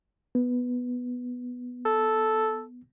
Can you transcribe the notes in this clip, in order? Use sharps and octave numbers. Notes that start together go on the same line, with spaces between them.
B3
A4